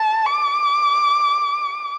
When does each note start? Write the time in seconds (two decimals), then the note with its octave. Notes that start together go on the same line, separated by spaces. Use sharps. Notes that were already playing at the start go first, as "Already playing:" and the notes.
Already playing: A5
0.26 D6